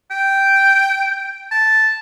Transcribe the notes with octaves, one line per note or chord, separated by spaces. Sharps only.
G5
A5